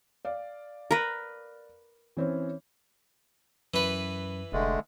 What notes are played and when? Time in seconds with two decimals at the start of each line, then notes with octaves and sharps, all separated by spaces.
0.25 D5 F5
0.91 A#4 B4
2.17 E3 C4 C#4
3.74 F#2 E3 B4
4.53 F1 D3 G#3 A3